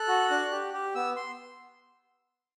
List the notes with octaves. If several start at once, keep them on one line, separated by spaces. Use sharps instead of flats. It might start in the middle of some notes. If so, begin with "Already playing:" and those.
Already playing: A4 F#6
F#4
D4
G4
G4
B3 E6
C6